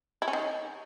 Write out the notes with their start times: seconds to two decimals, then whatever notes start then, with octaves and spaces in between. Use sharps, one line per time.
0.22 E4
0.28 C#4
0.33 D#3